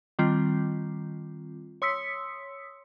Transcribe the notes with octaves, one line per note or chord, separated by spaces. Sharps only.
D#3 G3 C4 F4
C#5 C6 D#6 E6 B6 C#7